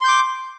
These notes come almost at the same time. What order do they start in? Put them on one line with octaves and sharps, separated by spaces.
C6 G6 D6